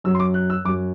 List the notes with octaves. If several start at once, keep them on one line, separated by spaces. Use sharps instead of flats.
F#2 F#3 E6
C6
D6
F#6
E6
F#2 F#3 D6